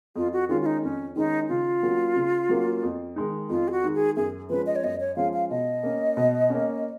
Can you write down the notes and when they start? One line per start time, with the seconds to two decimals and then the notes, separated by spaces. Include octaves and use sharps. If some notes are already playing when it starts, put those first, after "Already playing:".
0.16 F2 F4
0.33 F#4
0.49 D#3 G#3 C#4 F4
0.62 F4
0.66 D#4
0.83 F2 C#4
1.16 D#3 G#3 C#4 D#4
1.49 C#3 F4
1.83 F#3 A#3 C#4
2.16 C#3
2.49 F#3 A#3 C#4
2.83 F2
3.16 D#3 G#3 D#4
3.50 F2 F4
3.68 G#4
3.72 F#4
3.83 D#3 G#3 D#4
3.95 G#4
4.16 F#2 G#4
4.50 F3 G#3 C#4 B4
4.66 D#5
4.76 C#5
4.83 F#2 D#5
5.00 C#5
5.16 F3 G#3 C#4 F5
5.33 F5
5.50 B2 D#5
5.83 A#3 C#4
6.17 B2
6.50 A#3 C#4